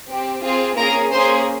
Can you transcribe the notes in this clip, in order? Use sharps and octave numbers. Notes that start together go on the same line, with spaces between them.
C4 G4
C4 F4 G#4
A#3 C#4 G#4 A#4 A#5
A#3 C#4 G#4 C5 C6